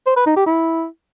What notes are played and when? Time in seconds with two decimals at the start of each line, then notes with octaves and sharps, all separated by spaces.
0.07 C5
0.17 B4
0.26 D#4
0.36 G4
0.46 E4